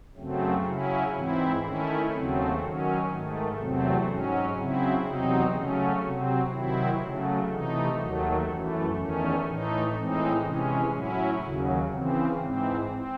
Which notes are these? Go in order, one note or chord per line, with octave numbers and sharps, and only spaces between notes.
F#2 C#3 F#3 A3 C4
C#3 F#3 C#4 E4
G#2 E3 C4 E4
D#3 A3 C#4 E4
D#2 C#3 F#3 A3 C4
D#3 F#3 C#4
G#2 D#3 A3
E2 C3 F#3 A3 C4
G#2 F#3 C#4
C#3 F#3 C4 E4
E2 C3 F#3 C4 D#4
C#3 F#3 A3 C#4
C3 F#3 C4
C3 D#3 F#3 C4 E4
C#3 F#3 A3
C3 E3 A3 D#4
D#2 D#3 F#3 A3
F#2 E3 A3
E2 D#3 A3 C#4
A2 E3 A3 D#4
A2 E3 G#3 C4 D#4
C3 E3 G#3 C#4
A2 F#3 C#4 E4
D#2 C#3 F#3
C#3 E3 C4
G#2 E3 C4
C4